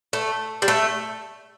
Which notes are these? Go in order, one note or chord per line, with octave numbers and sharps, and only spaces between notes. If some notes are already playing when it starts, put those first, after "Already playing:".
A3
G3
A3